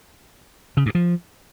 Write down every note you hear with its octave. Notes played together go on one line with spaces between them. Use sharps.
C#3
G2
F3